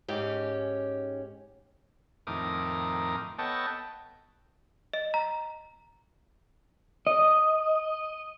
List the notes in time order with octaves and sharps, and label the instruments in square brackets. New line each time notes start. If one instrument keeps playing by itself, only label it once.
[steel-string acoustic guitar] G#2 C#4 G4
[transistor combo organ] F2 A2 D#3 A#4 D6 D#6
B3 A4 C#5 D#5 G5 A5
[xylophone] D#5
A#5
[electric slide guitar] D#5